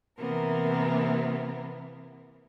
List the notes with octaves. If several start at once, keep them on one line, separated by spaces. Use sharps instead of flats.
C3 E3 A#3 B3 A#4